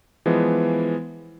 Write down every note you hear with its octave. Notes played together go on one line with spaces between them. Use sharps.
E3 F3 G#3 B3